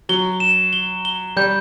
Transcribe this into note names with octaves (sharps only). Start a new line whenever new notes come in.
F#3 G7
E7
G7
G7
G3 G6